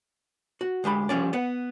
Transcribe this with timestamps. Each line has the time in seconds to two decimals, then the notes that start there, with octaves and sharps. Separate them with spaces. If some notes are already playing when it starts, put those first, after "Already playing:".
0.61 F#4
0.84 D2 G#3 G4 B5
1.09 F3 G3 C#4 D5
1.33 B3 B4 F#5